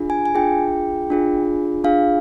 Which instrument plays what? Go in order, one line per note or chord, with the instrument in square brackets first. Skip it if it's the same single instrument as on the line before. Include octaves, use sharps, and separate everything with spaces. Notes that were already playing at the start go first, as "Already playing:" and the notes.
Already playing: [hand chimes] D4 F4 G#4
G#5
G#5
D4 F4 G#4 G5
D4 F4 G#4
D4 F4 G#4 F5